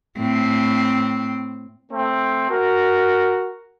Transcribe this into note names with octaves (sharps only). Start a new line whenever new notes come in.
A2 C4
A3 C4
F#4 A#4